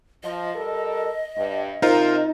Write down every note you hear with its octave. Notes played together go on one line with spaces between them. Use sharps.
F3 D#5
G3 A4 A#4
G2
C3 D#4 F4 A#4 C5